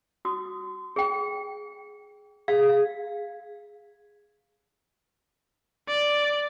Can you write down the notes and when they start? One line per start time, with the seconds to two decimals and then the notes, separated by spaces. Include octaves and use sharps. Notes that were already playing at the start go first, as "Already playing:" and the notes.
0.25 F#4 D#6
0.96 G#4 G5
2.48 G#4 F5
5.88 D5